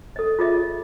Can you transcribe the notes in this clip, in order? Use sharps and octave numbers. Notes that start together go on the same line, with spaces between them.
A4 D#5
F4 G#4 D#5 E5